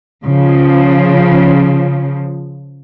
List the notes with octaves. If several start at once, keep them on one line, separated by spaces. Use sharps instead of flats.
C#3 F3